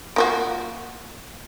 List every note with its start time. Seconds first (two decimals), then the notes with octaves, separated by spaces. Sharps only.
0.16 A#3 F4 F#4